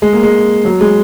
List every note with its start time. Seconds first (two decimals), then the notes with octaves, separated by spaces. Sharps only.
0.02 G#3
0.13 A#3
0.23 G#3
0.65 F#3
0.81 G#3